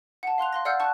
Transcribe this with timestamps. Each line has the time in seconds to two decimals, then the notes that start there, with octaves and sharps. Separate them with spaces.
0.23 F#5 A5
0.38 F5 C6 F#6 F7
0.53 F5 C6 A#6
0.65 D5 F5 F#5 E6 F6 G6
0.79 F#5 A5 C#6 F#6